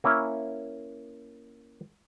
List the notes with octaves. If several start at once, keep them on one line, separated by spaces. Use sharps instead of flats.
A#3 C#4 E4